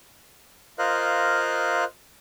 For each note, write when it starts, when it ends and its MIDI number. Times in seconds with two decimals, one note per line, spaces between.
0.79 1.84 65
0.79 1.84 70
0.79 1.84 72
0.79 1.84 75
0.79 1.84 77
0.79 1.84 90